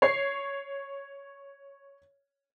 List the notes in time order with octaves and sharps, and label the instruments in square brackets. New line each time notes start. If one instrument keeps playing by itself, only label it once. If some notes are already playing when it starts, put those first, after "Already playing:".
[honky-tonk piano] C#5 C7